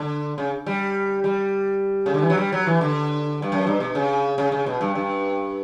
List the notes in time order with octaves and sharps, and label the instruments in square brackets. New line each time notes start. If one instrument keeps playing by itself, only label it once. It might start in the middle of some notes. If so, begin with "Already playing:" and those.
Already playing: [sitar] D3
C#3
G3
G3
C#3
D3
E3
F#3
G3
F#3
E3
D3
G2
F#2
G2
B2
C#3
C#3
C#3
B2
G2
G2